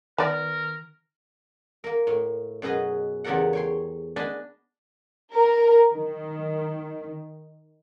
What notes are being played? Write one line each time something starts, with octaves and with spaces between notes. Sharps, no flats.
D#3 B3 A#4 D5
A#3 A#4
A2
F#2 B2 G#4 B4 D#5
E2 C#3 G4 A4 A#4 F#5
C#5 G5 C6
D4 B4 D#5 G#5 A5 B5
A#4
D#3